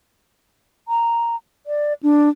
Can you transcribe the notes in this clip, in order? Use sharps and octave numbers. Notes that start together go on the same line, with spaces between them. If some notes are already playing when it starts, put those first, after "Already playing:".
A#5
D5
D4